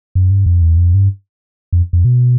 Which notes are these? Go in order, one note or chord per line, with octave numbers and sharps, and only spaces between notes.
F#2
G2
F2
E2
F2
G2
F2
F2
B2